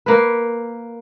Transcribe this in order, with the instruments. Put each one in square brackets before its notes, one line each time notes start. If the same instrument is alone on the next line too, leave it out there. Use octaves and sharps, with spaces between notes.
[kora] A#3 B4